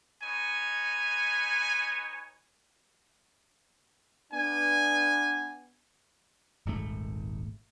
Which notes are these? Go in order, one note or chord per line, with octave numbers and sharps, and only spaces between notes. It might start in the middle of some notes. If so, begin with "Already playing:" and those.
D#4 B4 C#5 G#5
B3 D4 G#5
D#1 G#1 G#2 A3